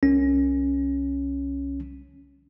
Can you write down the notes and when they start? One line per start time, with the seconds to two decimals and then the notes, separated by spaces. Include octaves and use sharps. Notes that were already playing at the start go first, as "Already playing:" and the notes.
0.03 C2 C#4